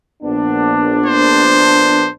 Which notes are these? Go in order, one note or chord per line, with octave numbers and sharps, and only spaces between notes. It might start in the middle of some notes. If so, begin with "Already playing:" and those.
A#1 B3 D4
C5